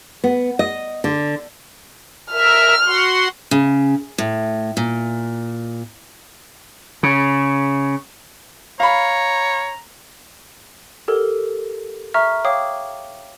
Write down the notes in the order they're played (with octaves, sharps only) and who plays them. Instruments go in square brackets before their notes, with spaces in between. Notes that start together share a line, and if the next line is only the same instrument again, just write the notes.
[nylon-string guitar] B3
D#5
D3
[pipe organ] A#4 E5 [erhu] F6
[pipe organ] F#4 F#5 C6
[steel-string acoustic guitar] C#3
A2
A#2
[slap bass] C#3
[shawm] C#5 [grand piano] F5 B5 [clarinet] A#5
[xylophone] G4 A4 A#4
E5 A#5 C#6 F6
C#5 F5 G5 D6 D#6